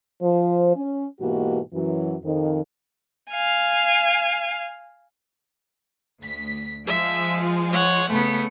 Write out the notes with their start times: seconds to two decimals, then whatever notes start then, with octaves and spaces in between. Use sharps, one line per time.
0.21 F3 C5
0.75 C#4
1.20 G#2 B2 E3 A#3 F#4 G4
1.72 F#2 E3 F#3
2.23 F2 D#3
3.32 F5 G#5
6.21 D2 B6
6.87 F3 G#3 E5
7.38 F4
7.72 C#5 F#5
8.10 C#3 A3 B3 C#7